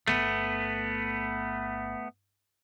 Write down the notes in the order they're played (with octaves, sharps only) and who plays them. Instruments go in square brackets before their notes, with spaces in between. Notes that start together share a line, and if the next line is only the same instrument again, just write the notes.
[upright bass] G1 [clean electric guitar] A3 B3